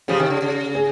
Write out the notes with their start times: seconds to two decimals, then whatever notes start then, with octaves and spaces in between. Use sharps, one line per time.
0.08 C#3 F3 G4
0.19 C3 D#3
0.30 C#3
0.42 C#3
0.75 G#4